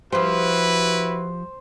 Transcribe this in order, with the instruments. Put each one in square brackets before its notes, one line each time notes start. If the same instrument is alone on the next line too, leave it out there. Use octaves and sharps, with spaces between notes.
[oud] F3 G4 [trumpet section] E4 F#4 B4 [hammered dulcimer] C5